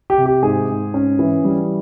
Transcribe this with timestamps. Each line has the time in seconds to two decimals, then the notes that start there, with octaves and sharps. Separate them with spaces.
0.10 G4
0.18 C3
0.26 G4
0.43 G#2 G#4
0.69 G#2
0.94 C#4
1.19 E3
1.44 G3